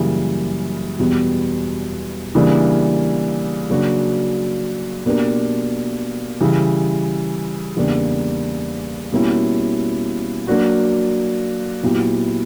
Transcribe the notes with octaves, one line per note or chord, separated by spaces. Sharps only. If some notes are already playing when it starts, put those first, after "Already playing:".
Already playing: F#2 C#3 E3 G3 A#3
E2 B2 G3 B3
C#3 E3 G3 A#3 D4
C#3 F#3 A#3 D4 F#4
B2 A#3 D4 G4 A#4
C#3 E3 G3
E2 C#3 G3 A#3 D4
B2 G3 A#3 C#4 E4
F#3 A#3 D4 F#4
A#2 F#3 B3 E4 G4